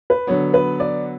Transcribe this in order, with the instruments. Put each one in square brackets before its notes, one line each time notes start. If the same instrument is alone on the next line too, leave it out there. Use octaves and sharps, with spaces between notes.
[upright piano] B4
[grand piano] D3 F#3 B3 [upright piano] C#5
[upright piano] B4
D5